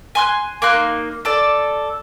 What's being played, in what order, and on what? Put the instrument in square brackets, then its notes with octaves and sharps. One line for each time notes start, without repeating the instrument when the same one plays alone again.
[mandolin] G#5 C6 F#6
A#3 D#4 C6 F#6
A4 D5